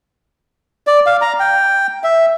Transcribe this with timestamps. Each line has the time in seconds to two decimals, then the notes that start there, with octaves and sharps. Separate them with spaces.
0.87 D5
1.06 F5
1.22 A#5
1.40 G5
2.04 E5